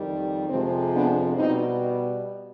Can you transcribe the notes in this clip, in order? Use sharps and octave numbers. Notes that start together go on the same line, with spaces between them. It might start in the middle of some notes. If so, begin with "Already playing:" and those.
Already playing: F2 D#3 G3
F2 C3 F3 G#3 C4
B3 D4
B2 G3 C4 D#4